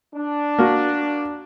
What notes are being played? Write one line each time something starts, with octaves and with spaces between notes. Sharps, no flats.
D4
A#3 F#4